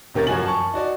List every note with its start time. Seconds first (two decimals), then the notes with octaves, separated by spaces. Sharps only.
0.14 D#1 C3 D#3 C#4 A#4 A6
0.27 F#2 F3 F#4 G#5 F#7
0.46 A5 C#6
0.74 D#4 F#4 D5